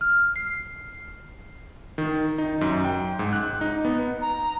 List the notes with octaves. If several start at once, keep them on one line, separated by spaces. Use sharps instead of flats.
F6
C7
D#3
D#4
F#2
G5
G#2
F#6
D#4
B3
A#5